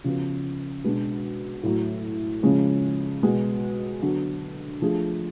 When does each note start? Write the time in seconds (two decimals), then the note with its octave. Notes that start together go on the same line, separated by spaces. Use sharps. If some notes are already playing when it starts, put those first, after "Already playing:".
0.04 C#3 F3 B3 F#4
0.84 B2 G#3 D4
1.63 A2 F#3 A3
2.43 C#3 F3 G#3 C#4
3.23 B2 G#3 B3 F#4
4.02 D3 F#3 B3
4.82 F3 A3 D4 G#4